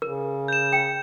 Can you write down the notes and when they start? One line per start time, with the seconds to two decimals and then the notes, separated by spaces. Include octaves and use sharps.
0.02 C#3 A#4
0.48 G6 E7
0.73 G5